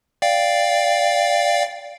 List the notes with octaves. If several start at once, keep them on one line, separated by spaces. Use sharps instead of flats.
D5 F5 G5